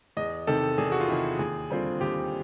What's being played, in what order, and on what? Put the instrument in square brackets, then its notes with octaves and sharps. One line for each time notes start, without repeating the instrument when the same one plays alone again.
[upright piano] E2 [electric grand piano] D#5
[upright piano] C3 D#3 [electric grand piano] A4
[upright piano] E2 [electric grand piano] G#4
[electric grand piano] F#4
F4
[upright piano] C3 D#3 [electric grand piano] E4
[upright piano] D#2 [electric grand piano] G#4
[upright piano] D3 G3 C4 F4
[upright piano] D#2 [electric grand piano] G4